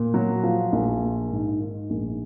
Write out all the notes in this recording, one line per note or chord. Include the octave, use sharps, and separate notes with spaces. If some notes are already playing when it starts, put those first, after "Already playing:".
Already playing: A#2
F#3
F3
A#1
A#3
G#2
D#3
A#1